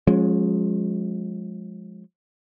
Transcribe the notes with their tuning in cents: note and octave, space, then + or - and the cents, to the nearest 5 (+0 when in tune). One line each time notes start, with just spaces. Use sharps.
F3 +35 G#3 +0 C#4 -10